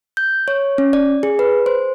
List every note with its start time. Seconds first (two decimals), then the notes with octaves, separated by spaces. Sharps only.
0.17 G6
0.48 C#5
0.78 C#4
0.93 D5
1.23 G#4
1.39 B4
1.66 C5